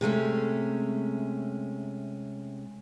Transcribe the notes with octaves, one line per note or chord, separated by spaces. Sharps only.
C3 G#3 A3 C#4